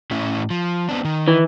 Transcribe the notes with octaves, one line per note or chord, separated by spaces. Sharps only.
A2 C#4 E4
F3
B3 C4 D4
D#3
E3